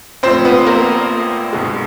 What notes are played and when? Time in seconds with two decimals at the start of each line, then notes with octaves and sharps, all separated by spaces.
0.23 A#1 A#2 F3 A3 C4 C5
0.45 B3 B4
0.66 A#3 A#4
1.53 B1 B2 G#3